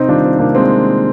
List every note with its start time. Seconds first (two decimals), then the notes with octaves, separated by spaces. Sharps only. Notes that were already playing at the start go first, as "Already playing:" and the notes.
Already playing: C3 C4 D#4
0.08 D#3 G3 D4 F4
0.24 C4 D#4
0.39 C3 A#3 D4
0.55 G#3 C4